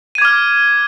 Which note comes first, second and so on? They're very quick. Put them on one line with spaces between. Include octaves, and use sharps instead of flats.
D#7 G#6 D6 F6